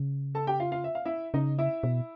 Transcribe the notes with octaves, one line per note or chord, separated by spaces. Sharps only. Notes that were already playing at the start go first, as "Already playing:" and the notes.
Already playing: C#3
A4 A5
G4 G5
F4 F5
F4 F5
E5
F5
E4 E5
C#3 D#4 D#5
E4 E5
B2